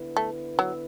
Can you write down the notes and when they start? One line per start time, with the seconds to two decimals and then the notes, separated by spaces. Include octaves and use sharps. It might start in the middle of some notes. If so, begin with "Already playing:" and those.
Already playing: D3 B3 E4 B4
0.17 A3
0.59 F#3